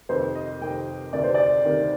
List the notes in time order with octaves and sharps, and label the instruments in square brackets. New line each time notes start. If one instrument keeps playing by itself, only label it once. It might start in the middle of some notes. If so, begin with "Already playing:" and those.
[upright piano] F2 C3 D#3 C5
D#5
F2 C3 D#3 G5
D2 C3 D#3 D5
C5
D5
D2 C3 D#3